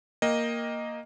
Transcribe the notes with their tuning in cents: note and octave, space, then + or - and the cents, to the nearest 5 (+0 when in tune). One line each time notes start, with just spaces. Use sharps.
A#3 +0 D#5 +0 G5 +15